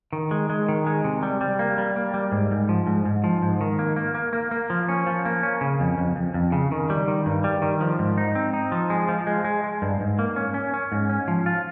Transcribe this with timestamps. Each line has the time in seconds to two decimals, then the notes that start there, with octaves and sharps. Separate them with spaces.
0.13 D#3
0.31 G#3
0.50 G#3
0.69 D#3
0.87 G#3
1.04 C3
1.23 G3
1.41 G3
1.59 A#3
1.78 G3
1.96 A#3
2.14 G3
2.32 G#2
2.51 G#2
2.69 F3
2.87 G#2
3.05 G#2
3.24 F3
3.42 G#2
3.61 D#3
3.79 A#3
3.96 A#3
4.15 A#3
4.33 A#3
4.51 A#3
4.70 F3
4.89 C#4
5.07 F3
5.25 A#3
5.43 C#4
5.61 C#3
5.80 F2
5.98 F2
6.16 F2
6.34 F2
6.52 C#3
6.72 D#3
6.90 G3
7.08 D#3
7.26 G2
7.44 G3
7.62 D#3
7.81 F3
7.99 G#2
8.18 D#4
8.35 C4
8.53 D#4
8.72 F3
8.90 G#3
9.09 F3
9.27 G#3
9.45 G#3
9.64 G#3
9.82 G2
10.00 G#2
10.19 A#3
10.36 C#4
10.54 C#4
10.74 C#4
10.92 G#2
11.09 C#4
11.28 F3
11.46 F4